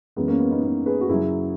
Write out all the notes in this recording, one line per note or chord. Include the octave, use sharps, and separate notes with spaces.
F#2 E3 G#3 B3
A#3 C#4
B3
B3 D#4
B3 D#4
G#4 B4
F#4
F#2 C#3 F#3 E4 G#4